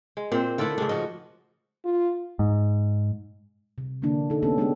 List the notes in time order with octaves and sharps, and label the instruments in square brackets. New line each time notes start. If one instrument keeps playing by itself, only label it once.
[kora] G#3
[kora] A#2 C5 [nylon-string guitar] C4
[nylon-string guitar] D3 A3 E4 [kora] F4 A4 D5
[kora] G#2 C#3 D4 [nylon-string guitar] G#3
[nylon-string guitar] F3 F#4 [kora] D#5
[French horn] F4
[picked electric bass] G#2
[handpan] C3
D3 E3 A#3 D4
D#4 A4
A#3 B3 C#4 D4 G4 A4
G#3 A3 B3 D4 G4